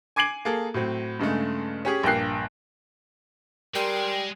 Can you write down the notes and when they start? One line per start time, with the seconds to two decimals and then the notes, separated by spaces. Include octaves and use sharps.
0.16 G#5 D6 G#6 C7 D7 F#7
0.45 A#3 G#4 A4
0.74 A2 F#3 C4
1.19 G2 C#3 G#3 A3
1.85 C#4 G4 G#4
2.03 A#1 G2 A#3 G5 F#6 C7
3.75 G3 G#3 A#4 G5 C6